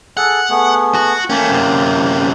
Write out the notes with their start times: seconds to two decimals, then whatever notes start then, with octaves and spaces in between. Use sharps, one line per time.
0.17 G#4 A4 F#5
0.50 A3 B3 G#4
0.95 F#4
1.30 A3 A#3 C#4 G5
1.49 F#2 C3